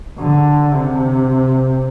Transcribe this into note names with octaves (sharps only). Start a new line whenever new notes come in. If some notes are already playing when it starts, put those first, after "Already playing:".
D3
C3